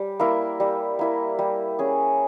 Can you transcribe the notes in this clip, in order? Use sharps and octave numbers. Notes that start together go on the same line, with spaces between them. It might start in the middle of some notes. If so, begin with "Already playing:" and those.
Already playing: G3
A#3 E4 A#4
G3
A#3 E4 A#4
G3
C#4 G#4